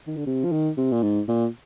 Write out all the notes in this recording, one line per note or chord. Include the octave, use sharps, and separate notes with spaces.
D#3
D3
C3
F3
D#3
C3
A#2
G#2
A#2